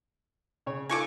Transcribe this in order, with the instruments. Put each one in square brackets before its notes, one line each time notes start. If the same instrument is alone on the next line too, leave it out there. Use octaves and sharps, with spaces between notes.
[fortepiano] C#3 C#5
[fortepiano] D#4 F4 A4 [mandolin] G#5 C#6 D6